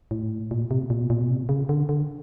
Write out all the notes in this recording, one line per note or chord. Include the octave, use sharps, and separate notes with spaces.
A2
A#2
C3
A#2
B2
A#2
B2
C3
C#3
D3
D3